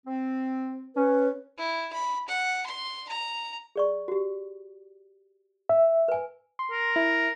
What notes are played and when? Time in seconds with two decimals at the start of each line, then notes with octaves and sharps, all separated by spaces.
0.07 C4
0.96 C#4 B4
1.58 E4
1.93 B5
2.28 F#5
2.66 C6
3.09 A#5
3.76 G#4 D5 C#6
4.08 F#4 G4
5.69 E5
6.08 B4 G#5
6.59 C6
6.71 A#4
6.96 E4